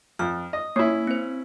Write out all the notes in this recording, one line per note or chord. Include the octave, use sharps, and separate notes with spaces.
F2 F6
D#5
A#3 C#4 E4
C4 C5